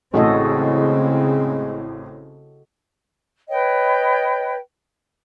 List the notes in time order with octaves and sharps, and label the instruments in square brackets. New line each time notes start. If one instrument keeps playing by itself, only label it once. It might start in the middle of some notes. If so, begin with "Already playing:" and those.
[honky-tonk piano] A1 A2 [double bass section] C#3 C4 [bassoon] G#3 [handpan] F#4 A4 D#5
[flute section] B4 C#5 D#5 G5